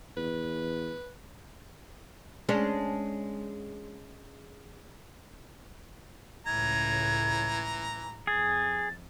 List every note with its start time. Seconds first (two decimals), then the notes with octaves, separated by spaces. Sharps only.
0.17 E2 B4
2.49 G#3 C#4 D4
6.46 C#2 A2 E3 A#5 G#6
8.27 F2 G#4 A6